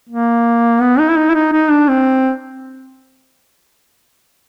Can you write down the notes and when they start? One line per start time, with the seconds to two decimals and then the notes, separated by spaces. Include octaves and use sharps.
0.10 A#3
0.81 B3
0.99 D#4
1.10 E4
1.17 D#4
1.30 E4
1.34 D#4
1.53 D#4
1.70 D4
1.88 C4